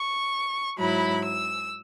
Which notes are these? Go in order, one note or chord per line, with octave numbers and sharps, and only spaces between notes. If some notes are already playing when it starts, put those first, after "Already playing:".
Already playing: C#6
G#2 F#3 E4 B5
E6